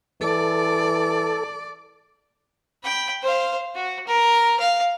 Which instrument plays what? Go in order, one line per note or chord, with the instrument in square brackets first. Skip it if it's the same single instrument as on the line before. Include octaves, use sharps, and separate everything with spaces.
[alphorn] E3 [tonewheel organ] A4 [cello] D5
[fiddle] G5 B5
C5 F5
F#4
A#4
F5